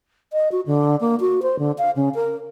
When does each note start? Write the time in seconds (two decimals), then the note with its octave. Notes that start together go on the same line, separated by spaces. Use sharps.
0.33 D#5
0.52 F#4
0.66 D3
1.00 A#3
1.20 F#4
1.42 C5
1.59 D3
1.78 F5
1.96 C#3
2.15 A#4